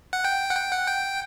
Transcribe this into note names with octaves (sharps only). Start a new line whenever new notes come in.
F#5
G5
F#5
G5
F#5
G5